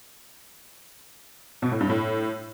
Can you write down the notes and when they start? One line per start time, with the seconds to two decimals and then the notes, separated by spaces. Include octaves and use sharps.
1.62 B2
1.71 A2
1.80 G2
1.90 A2